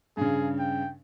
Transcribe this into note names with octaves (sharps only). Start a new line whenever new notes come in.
G2 C#3 G#4
G5